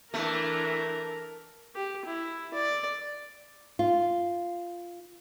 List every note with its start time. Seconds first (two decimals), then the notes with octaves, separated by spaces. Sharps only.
0.14 E3 A3 D4 A#4
1.76 G4
2.06 E4
2.54 D5
3.79 F4